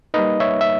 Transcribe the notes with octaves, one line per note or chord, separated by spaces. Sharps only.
G3 A#3 D#4 B4 D#5
C#5 E5
E5